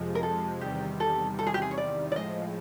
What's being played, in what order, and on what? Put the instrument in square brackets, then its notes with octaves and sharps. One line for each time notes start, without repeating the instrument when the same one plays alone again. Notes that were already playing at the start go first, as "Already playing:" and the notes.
Already playing: [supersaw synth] F2 C3 F3 G#3
[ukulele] A#4
A4
[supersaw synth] E2 C3 D#3 G3 [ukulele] G4
[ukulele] A4
A4
G#4
G4
G#4
C#5
D5
D5
[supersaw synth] A2 F3 G#3 [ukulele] D#5